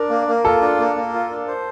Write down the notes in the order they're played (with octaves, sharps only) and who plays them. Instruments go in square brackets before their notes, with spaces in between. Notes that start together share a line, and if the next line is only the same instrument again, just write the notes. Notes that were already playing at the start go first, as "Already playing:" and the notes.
Already playing: [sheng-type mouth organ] D4 [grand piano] A#4
[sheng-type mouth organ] A#3
A#3
[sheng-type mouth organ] F4 [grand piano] A4
[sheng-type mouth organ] D4
A#3
A#3
F4
D4
C5